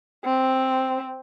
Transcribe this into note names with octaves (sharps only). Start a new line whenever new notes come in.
C4